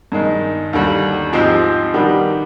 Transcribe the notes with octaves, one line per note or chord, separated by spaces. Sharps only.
G2 D#3 G#3
D#2 D3 G3
G#2 F3 G#3 C4 G4
D#3 G3 B3 D4 G4